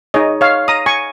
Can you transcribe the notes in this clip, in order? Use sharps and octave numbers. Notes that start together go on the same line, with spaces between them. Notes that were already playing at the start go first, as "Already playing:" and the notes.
D#4 G#4 C#5 D#5
C#5 F5
A#5 D#6
G#5 C#6